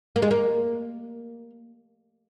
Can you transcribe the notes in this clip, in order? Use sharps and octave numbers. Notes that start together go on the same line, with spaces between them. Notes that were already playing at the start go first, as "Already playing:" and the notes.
A#3
G#3
A#3